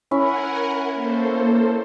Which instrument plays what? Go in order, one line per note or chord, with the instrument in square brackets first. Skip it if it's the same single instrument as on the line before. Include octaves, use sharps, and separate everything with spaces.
[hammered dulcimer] C#4 E4 [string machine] A#4 F#5 G#5
[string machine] A#3 A4 C5